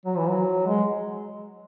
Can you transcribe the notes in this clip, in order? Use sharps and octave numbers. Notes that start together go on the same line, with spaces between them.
F#3
E3
F#3
G#3